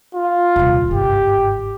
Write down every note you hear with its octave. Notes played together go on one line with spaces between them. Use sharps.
F4
D#1 C2
G1 G#2 G4